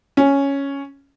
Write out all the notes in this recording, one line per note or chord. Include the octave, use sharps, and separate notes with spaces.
C#4